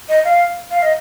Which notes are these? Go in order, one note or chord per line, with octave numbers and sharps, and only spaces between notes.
D#5
F5
F5
D#5